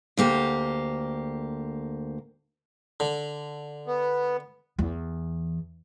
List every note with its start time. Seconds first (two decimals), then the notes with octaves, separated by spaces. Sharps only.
0.17 D2 A#3 G4
3.00 D3
3.87 B3
4.79 E2